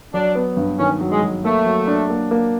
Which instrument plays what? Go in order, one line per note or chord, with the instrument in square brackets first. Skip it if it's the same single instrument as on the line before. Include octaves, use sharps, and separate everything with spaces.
[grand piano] F#3 [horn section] D4
[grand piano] B3
G2
[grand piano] D#3 [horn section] C#4
[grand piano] F#3
[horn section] G#3
[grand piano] F#3
[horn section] A3 [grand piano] A#3
[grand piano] F#3
D4
A#3
A#3